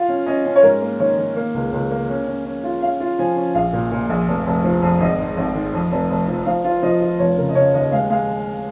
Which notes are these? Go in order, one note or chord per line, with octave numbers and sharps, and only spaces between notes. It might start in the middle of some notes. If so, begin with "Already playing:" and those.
Already playing: F4 F5
C#4
C#4 D#5
C#4
C#5
G#2 A#4
A#3
D#3 C#5
D#3
A#3
C#2
C#2
A#3
C#4
C#4
C#4
F4
C#4 F5
F4
F3 G#5
C#4
A#1 F5
A#2
A#2
A#1
F1
F1
F3
F2
G#1 D#5
G#2
G#1
D#3
F2
F1
F1
F3
F3 F5
F4
F3 D#5
F4
F1 C#5
C#3 A#4
D#5
C#3 C#5
D#2 D#5
G#3 F5
G#3 F5